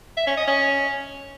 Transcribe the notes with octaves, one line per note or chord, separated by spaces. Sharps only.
E5
C#4
D#5
C#4